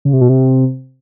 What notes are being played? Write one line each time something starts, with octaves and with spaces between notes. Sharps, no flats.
C#3
C3
B2
C3